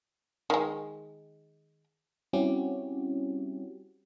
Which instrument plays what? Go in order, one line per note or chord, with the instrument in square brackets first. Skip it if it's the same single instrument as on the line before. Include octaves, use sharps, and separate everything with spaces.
[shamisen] D#3 G#3
[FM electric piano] G3 C4 C#4 E4 F#4 G4